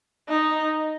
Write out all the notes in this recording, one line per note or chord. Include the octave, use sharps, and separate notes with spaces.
D#4